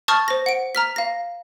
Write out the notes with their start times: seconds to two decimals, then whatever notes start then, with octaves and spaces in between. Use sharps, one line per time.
0.08 A5 C#6 D#6 F6 G6 A6
0.28 C5 A#6
0.46 F#5 D7
0.75 A#5 F6 B6
0.96 F5 A#6